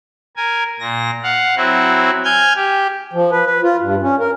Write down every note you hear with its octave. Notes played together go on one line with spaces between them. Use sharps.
A#4 G#5
A#2 A#6
F5 F#5
F#3 C4 E4 F#4
G#5 F6 G6 G#6
G4
F3
B4
B4
F4
G2
C#4
A#4